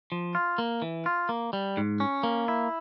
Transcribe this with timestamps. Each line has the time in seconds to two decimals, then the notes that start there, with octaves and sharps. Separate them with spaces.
0.12 F3
0.35 F4
0.58 A#3
0.82 E3
1.06 F4
1.29 A#3
1.53 G3
1.77 G#2
2.00 C#4
2.23 A#3
2.48 E4